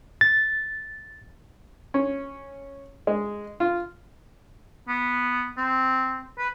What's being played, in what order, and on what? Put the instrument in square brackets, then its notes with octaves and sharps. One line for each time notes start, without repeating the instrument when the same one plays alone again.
[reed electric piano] A6
[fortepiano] C#4
G#3
F4
[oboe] B3
C4
B4